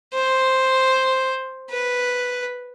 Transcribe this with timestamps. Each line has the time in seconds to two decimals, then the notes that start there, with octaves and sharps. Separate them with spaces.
0.13 C5
1.70 B4